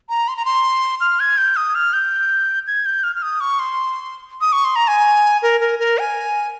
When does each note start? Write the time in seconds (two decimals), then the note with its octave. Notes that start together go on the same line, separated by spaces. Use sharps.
0.09 A#5
0.28 C6
0.37 A#5
0.45 C6
1.01 F6
1.20 G#6
1.38 G6
1.56 D#6
1.75 F6
1.93 G6
2.67 G#6
2.86 G6
3.04 F6
3.16 F6
3.22 D#6
3.41 C#6
3.59 C6
4.41 D#6
4.52 C#6
4.64 C6
4.76 A#5
4.88 G#5
5.42 A#4
5.61 A#4
5.79 A#4
5.99 G#5